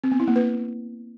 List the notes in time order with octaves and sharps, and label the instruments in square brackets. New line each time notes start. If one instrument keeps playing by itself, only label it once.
[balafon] C4
B3
E4
A#3
B4